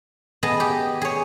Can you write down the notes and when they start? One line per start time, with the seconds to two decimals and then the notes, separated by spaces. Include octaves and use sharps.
0.43 B3 G#4 D#5 A5
0.60 G4
1.02 G#4 C#5